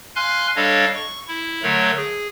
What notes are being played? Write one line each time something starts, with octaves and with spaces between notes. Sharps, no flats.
F5 G#5 C6 F6 F#6
G3 D4 A4 C#5 D#5 F5
C#6
E4
D3 F#3 A3 A#4 C#5
G#4